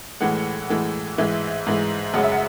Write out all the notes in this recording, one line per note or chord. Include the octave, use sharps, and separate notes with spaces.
A2 E3 G#3 F#5
A2 E3 G#3
G#2 E3 G#3 E5
G#2 E3 G#3
F#2 C#3 G#3 F#5
E5
F#5